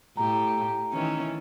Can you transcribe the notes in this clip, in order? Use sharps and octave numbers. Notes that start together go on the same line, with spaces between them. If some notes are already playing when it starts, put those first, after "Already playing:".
A2 G4 A#5
D#3 E3 C#4